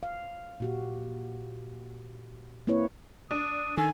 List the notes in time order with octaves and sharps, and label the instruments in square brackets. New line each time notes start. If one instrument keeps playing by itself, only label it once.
[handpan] F5
A#2 F#4 G4
A#3 C4 E4 B4 C#5
[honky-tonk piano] D4 [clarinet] D#6
[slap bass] D#3 [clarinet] A4 [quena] G#5